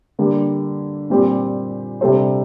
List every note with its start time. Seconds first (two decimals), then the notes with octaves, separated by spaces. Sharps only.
0.19 D3 G3 A#3
1.10 A#2 G3 C4 G4
2.01 C3 G3 D4 A4 C5